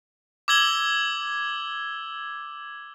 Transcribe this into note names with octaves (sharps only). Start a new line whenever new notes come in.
D6 E6 G#6 F#7 G7